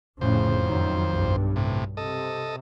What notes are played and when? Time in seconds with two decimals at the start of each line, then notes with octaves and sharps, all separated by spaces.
0.21 F1 F2 A2 C#3 C5
0.61 F#2 D#3 F#3
1.10 B1 G2
1.56 A2 C3
1.97 C3 A4 D#5